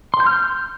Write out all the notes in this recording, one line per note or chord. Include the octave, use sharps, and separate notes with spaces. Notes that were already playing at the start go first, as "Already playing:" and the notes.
C6
G6
F6
G6